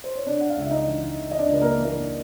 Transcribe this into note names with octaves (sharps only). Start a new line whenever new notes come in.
C5
C#5
C3 D4 D5
F#5
F5
C#2 E5
D#4 D#5
E3
E3
D#5
D4 D5
C#2
B4
A#3 A#4
E3
A#3 A#4